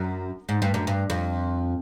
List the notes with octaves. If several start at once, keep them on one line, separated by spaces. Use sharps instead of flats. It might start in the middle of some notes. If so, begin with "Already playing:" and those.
Already playing: F#2
G#2
G2
F#2
G2
F2